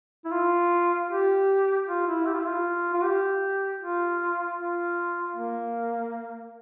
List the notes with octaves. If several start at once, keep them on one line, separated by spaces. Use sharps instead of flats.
E4
F4
G4
F4
E4
G4
F4
E4
F4
F4
G4
F4
F4
A#3